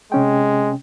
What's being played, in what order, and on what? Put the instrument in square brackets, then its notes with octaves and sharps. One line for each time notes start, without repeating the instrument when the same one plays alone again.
[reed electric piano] C3 C#4 G5 [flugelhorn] G#3